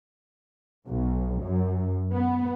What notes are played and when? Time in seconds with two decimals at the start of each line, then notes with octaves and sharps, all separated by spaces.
0.88 B1
1.44 F#2
2.12 B3